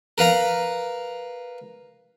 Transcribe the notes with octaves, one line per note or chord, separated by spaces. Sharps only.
A#4 B4 F5 A#5